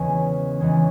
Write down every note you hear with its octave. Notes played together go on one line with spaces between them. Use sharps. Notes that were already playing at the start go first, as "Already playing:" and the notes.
Already playing: E2 C#3 E3 G#3 C#4
E2 C#3 E3 G#3 C#4